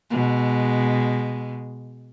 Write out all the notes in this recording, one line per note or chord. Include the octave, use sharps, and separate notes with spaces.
B2 G#3